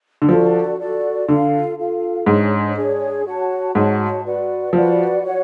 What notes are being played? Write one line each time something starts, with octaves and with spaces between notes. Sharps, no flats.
D3
F3 F#4 A4 D5
F#4 A4 D5
D3 F4 A4 F5
F4 A4 F5
G#2 D4 G#4 C#5
D4 G#4 C#5
F#4 C#5 F#5 A5
G#2 F#4 C#5 F#5 A5
F#4 B4 D5 F#5
F3 F#4 B4 D5 F#5
F#4 C#5 F#5